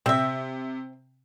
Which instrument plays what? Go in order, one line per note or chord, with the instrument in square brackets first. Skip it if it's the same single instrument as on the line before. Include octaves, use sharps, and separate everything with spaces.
[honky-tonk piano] C3 [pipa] C4 E5